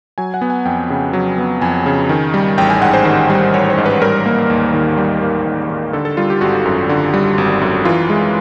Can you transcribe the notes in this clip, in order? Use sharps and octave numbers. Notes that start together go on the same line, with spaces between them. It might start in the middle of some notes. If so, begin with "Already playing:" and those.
F#3 G#5
F#5
B3
G#5
F2 G5
C#3
F#3
B3
F2 G#5
C#3
D#3
G3
A1 G5
G#5
G#2 F#5
C5
D#3
G3
A1 C#5
C5
G#2
B4
G3 A#4
A#3
D#2
D#3
G3 G4
A#3
D#2
D#3
D3 A4
A4
G3 F4
G4
G#1 F#4
F#2
D3
G3
G#1
F#2
E3 F4
G#3